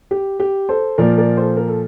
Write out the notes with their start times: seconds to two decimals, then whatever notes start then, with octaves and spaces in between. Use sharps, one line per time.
0.11 G4
0.40 G4
0.69 A4 C5
0.98 A#2 F3 A#4 D5
1.18 A#4 D5
1.37 A4 C5
1.57 A#4
1.68 A4